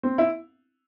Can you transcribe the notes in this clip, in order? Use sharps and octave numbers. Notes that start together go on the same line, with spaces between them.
C4
E4